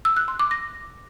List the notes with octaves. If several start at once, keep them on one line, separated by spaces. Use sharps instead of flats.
E6
F#6
C6
D6
A#6